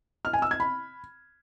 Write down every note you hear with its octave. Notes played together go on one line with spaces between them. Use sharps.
F6
G#5
E6
G#6
B5